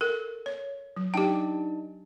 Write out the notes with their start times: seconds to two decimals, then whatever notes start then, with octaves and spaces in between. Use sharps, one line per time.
0.01 A4 A#4
0.46 C#5
0.96 F#3
1.14 D4 D#4 G4 G5 A5